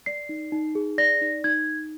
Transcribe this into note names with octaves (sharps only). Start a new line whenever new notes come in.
D5 C7
D#4
D#4
G#4
D5 A#6
D#4
D#4 G#6